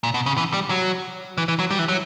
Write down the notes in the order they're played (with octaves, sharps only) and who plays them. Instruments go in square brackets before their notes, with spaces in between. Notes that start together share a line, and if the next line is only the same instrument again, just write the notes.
[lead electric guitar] A#2
B2
C#3
E3
G3
F#3
E3
E3
F#3
G3
E3
F#3